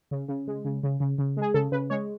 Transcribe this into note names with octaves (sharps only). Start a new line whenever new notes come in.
C#3
C#3
G#3
C#3
C#3
C#3
C#3
G#3 G#4
C#3 A4
C#3 B4
G#3 C#5